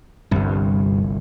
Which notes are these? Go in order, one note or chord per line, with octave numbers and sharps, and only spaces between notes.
G1 C2 G2